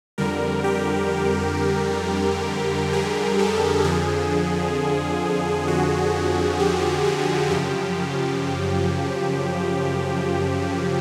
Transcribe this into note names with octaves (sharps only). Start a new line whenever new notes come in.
F2 D3 G3 A#4
G4
G#4
A4
F2 D3 F3 G#4
F#4
G4
G4
F#2 C#3 F3 G4